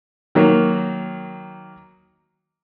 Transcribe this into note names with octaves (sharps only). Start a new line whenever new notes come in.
D#3 F#3 A#3